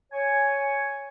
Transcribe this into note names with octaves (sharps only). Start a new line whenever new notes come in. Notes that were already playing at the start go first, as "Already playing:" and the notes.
C#5 G#5